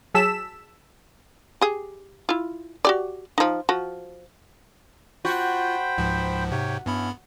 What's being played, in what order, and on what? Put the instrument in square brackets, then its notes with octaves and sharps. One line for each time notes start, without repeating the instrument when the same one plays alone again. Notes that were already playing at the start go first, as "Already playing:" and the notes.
[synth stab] F#3 G#4 A5 E6 B6 E7
[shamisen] G4 G#4
E4 F4
F#4 G4 D5
F3 D#4
F3 F#4
[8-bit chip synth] F4 [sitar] F#4 [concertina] C5 G5 B5
[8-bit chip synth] C#2 G#2 F3
[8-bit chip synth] G#2 C3 [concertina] C#5 G5
[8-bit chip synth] G2 B3 B5 [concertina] C#4 E4